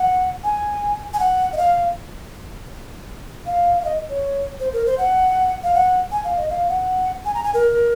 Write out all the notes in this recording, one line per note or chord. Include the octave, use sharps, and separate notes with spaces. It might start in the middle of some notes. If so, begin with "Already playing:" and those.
Already playing: F#5
G#5
G#5
F#5
D#5
F5
F5
F5
D#5
C#5
C5
A#4
C5
F#5
F5
F#5
G#5
F5
D#5
F5
F#5
G#5
A#5
G#5
A#4